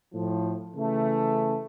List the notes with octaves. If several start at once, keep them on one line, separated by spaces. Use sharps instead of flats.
A2 F3
C#3 E3 A3